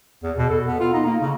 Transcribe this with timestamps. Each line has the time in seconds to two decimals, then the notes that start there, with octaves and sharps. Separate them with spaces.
0.23 E2
0.38 B2
0.49 A4
0.66 B3
0.80 F4
0.93 D#4
1.05 A#3
1.20 C#3